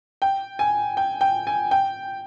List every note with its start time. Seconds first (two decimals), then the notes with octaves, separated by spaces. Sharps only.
0.22 G5
0.59 G#5
0.97 G5
1.21 G5
1.47 G#5
1.71 G5